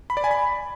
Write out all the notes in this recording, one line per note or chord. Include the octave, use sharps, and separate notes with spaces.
B5
D5
G#5
B5